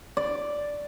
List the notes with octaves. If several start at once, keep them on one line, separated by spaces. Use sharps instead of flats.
D5